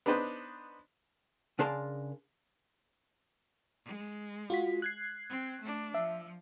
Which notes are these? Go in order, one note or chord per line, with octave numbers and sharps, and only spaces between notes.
B3 D4 D#4 B4 C5
C#3 D4 G#4 A#4 A5 C6
G#3
F4 F#4 B6
F#6 G#6 C7
C4
A3 D4
F3 E5